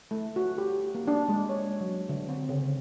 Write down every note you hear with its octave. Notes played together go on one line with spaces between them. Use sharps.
A3
F#4
G4
A#3
D4
G#3
C#5
F#3
D3
C4
C#3